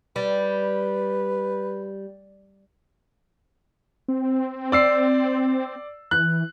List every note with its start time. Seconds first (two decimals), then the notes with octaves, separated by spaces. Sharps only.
0.16 G3 B4
4.08 C4
4.72 D5 E6 C7
6.11 E3 F#6